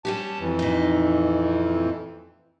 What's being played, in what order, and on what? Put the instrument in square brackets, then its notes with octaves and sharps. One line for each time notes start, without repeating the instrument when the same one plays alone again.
[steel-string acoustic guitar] G3 C#4 G4 [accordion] A5
[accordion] F2 E3
[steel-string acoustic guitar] A#2 D#4